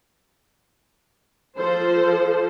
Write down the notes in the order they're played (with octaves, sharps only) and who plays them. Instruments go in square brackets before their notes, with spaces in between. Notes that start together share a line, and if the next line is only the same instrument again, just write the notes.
[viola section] F3 A4 C5